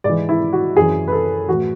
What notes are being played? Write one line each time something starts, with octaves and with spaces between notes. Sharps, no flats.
G#2 D5
E3
E4
F#4
F#2 E3 G#4
B4
A4
A2 E3 F#4